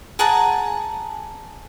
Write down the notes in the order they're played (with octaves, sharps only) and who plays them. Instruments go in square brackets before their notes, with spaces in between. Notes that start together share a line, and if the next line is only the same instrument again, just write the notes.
[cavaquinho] G#4 F#5 A5 A#5